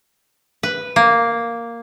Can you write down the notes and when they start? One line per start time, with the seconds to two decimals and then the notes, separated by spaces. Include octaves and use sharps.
0.63 B4
0.96 A#3